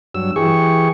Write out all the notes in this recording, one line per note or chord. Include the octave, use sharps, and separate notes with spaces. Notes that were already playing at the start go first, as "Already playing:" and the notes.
G2 F#3 E6
E3 G4 G#4 C#6